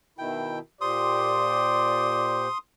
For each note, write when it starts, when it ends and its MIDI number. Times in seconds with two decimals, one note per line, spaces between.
0.18 0.59 47
0.18 0.59 51
0.18 0.59 64
0.18 0.59 79
0.81 2.47 46
0.81 2.47 67
0.81 2.47 72
0.81 2.44 74
0.81 2.58 84
0.81 2.58 87